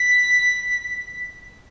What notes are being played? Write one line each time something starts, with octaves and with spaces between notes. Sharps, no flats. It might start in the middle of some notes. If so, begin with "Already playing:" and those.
Already playing: B6